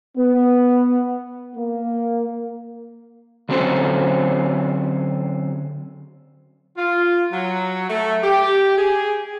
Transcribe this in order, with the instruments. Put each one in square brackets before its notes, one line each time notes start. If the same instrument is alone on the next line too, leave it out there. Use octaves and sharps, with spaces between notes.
[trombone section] B3
A#3
[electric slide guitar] D3 F#3 C4 C#4 A4 C5
[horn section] F4
F#3
A3
G4
G#4